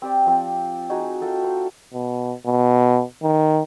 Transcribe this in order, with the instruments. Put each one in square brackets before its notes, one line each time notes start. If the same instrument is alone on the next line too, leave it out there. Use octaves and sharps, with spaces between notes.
[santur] C4 G4 D5
F3 C4
D#4 F#4 G#4 G#5
F4 F#4 A4 G5
C5
[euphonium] B2
B2
D#3